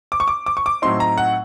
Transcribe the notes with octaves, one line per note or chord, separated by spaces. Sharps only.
D6
C#6
D6
D6
C#6
D6
A2 F#3 A3 C4 D#4 C6
A#5
F#5